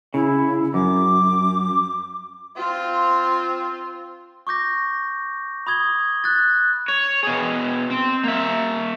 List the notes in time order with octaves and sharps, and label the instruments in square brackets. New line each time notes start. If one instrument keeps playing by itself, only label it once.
[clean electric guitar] C#3 [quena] E4
[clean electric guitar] F#2 [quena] D6
[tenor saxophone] C4 [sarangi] F4
[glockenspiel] C#6 D6 G6 A#6
B5 D#6 G#6 G7
F#6 A6
[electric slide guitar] C#5
B2 G#4
C4
A#3 E5